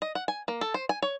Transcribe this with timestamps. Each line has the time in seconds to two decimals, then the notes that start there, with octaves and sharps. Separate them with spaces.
0.02 D#5
0.15 F#5
0.28 G#5
0.48 A#3
0.61 A4
0.74 C5
0.89 G#5
1.02 C#5